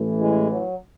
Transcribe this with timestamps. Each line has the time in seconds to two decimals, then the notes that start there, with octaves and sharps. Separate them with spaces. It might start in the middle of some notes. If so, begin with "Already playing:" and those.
Already playing: A1 A2 E3
0.21 G#3
0.50 F#3